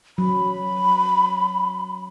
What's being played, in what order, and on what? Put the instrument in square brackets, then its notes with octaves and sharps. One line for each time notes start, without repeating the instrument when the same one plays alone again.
[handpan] F#3 [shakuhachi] B5